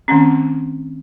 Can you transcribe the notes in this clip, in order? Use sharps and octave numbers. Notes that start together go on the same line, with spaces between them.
D#3 A3 C4 C#4